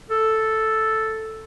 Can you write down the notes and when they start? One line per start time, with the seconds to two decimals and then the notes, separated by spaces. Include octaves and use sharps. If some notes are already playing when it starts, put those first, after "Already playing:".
0.10 A4